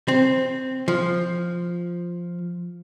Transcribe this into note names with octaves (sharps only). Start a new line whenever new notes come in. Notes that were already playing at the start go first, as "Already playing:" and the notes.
C4
F3